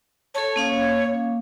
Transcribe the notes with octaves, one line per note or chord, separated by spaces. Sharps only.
A4 C#5 A5
A#3 C#4 F5